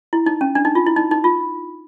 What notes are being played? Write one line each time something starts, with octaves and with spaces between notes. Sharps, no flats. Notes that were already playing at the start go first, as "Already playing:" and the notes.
E4
D#4
C#4
D4
D#4
F4
E4
D#4
D#4
F4